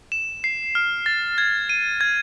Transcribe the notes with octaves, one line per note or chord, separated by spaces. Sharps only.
E7
C7
F6
A6
G#6
D#7
G#6